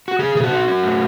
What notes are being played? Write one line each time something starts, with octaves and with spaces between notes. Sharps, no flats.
F#4
C#3 G#4
C#3 G#4
F#4
D#4
C#4
A2